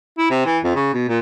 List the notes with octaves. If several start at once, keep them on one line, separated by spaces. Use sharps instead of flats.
E4
C3
E3
F2
C#3
B2
A#2